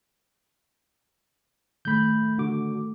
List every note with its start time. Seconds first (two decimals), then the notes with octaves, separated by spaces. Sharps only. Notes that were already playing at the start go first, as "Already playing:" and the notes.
1.85 D#3 A3 B5 G6
2.38 D3 F#4 D6